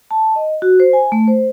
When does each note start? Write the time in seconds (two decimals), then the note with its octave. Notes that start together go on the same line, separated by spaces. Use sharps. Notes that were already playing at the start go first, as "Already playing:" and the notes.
0.11 A5
0.36 D#5
0.62 F#4
0.80 C5
0.93 G#5
1.12 A3
1.28 C5